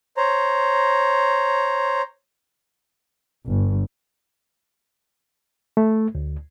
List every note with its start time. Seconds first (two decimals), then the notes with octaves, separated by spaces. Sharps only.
0.17 C5 C#5 A#5
3.46 G1
5.77 A3
6.15 D2